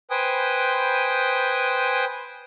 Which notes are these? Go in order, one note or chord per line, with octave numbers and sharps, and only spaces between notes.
B4 C5 G5 G#5 D#6